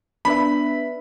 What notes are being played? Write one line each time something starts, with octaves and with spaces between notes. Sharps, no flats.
B3 D4 B4 E5 B5